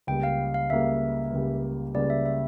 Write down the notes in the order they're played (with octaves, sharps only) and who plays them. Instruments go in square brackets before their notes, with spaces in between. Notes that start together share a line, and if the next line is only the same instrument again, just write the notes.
[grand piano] C#2 C#3 G3 A#3 [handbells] G5
[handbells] F5
F5
[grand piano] C#2 C#3 G3 A#3 [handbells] E5
[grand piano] C#2 C#3 G3 A#3
[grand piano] C#2 C#3 G3 A#3 [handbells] D5
[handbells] E5
E5